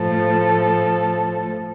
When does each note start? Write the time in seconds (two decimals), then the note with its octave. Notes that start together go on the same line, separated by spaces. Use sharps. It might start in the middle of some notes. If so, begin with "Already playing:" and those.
Already playing: A2 F3 A4